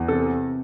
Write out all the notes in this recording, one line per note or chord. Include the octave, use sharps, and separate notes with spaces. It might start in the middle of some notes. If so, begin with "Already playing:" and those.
Already playing: E2
C3 A4